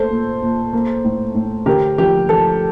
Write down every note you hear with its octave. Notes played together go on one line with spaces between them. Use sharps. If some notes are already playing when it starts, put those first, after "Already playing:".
Already playing: A3 A#3 A4 C5
A#2
A#2
A#3
A2
A2
D3 G4 A#4
F3 G4
F3 A4